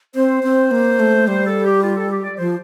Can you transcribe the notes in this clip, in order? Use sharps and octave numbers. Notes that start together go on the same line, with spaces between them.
C4 C5
C4
A#3
A3
G3 C5
A4
G4
F4
A4
G4
D5
F3 C5